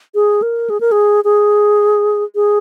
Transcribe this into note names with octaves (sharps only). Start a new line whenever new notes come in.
G#4
A#4
G#4
A#4
G#4
G#4
G#4